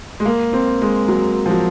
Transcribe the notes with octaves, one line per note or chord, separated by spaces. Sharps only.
G#3
A#3
C4
G#3
F#3
F3
F#3